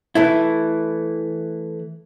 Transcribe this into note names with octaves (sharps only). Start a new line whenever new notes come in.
E3 A3 E4